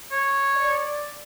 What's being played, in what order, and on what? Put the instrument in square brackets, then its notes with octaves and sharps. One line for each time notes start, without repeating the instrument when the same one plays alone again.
[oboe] C#5
[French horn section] D5